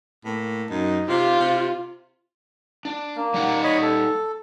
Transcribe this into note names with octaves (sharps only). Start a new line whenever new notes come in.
A2 A#3
F#2 D#4
C3 F4 G4 F5
C3
D4
A#3
G3 D#4 F#5
C#5 D#5 B5
A4